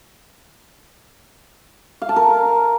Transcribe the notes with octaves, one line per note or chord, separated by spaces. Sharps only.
F5
A5
A#4